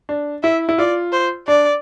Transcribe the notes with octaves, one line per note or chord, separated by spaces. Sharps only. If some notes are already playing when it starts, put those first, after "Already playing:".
D4
E4 E5
E4
F4 D5
C5
D4 D5